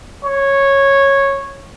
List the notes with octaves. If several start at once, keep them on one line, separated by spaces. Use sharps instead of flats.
C#5